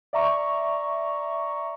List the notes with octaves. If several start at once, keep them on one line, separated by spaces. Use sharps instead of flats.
D5 E5 A#5 C#6